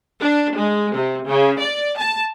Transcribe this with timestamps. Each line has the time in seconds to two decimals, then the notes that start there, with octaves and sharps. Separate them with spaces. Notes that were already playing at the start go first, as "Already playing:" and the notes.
0.20 D4
0.54 G#3
0.94 C3
1.27 C#3
1.59 D5
1.97 A5